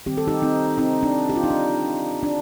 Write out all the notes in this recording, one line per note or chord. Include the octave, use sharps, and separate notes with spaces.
D#3 G3 C4 G4
A4
D#4 G4
C4 D#4
C4 D#4
D4
G4
F4
D#4
D4
D4